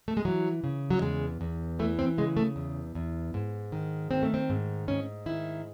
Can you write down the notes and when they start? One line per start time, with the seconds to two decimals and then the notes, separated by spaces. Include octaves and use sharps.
0.08 A3
0.17 G#3
0.25 E3 F#3
0.64 C#3
0.90 F#3
1.02 E2 G#3
1.41 E2
1.79 E3 A3
1.99 C4
2.18 C#3 G#3
2.37 A3
2.56 E2
2.95 E2
3.34 G#2
3.72 D#3
4.11 D#3 C4
4.23 A3
4.34 C4
4.50 G#2
4.88 G#2 C#4
5.26 D#3 E4